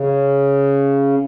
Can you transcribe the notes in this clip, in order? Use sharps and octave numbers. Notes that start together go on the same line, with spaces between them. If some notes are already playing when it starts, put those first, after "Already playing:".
Already playing: C#3